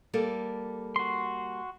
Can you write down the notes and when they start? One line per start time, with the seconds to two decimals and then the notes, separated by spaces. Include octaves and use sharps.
0.14 G3 A#3 A4
0.96 F#4 C6